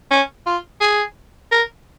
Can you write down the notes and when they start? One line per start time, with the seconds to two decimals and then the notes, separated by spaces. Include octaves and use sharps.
0.11 C#4
0.46 F4
0.81 G#4
1.51 A#4